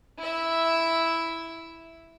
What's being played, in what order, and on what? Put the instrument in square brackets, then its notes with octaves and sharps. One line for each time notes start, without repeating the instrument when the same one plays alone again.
[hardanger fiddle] E4 E5